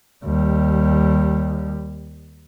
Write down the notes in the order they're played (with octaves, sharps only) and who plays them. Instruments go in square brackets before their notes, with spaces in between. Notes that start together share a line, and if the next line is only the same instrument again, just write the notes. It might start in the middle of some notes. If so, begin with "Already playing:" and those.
[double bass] D#2 G3